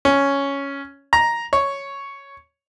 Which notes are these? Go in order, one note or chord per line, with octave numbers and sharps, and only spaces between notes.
C#4
A#5
C#5